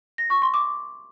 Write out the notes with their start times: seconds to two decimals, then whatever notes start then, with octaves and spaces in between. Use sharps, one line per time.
0.18 A#6
0.30 C#6
0.42 C6
0.54 D6